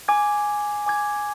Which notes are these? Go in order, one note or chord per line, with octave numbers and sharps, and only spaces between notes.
G#5 D6 G#6
G#5 D6 G#6